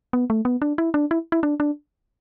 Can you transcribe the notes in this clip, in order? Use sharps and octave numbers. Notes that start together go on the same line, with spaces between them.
B3
A3
B3
D4
E4
D4
E4
E4
D4
D4